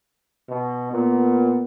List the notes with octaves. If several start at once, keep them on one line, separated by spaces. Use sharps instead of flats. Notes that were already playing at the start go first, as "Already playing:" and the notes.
B2
A#2 B3